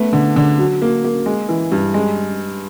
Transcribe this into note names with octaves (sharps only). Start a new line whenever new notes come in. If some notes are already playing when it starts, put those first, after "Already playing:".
Already playing: A3 B3
D3
D3
F#3
A#3
A#3
G#3
E3
G2
G#3